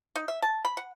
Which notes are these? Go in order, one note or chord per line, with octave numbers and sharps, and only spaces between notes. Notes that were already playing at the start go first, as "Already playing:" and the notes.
D#4
E5
A5
B5
F#5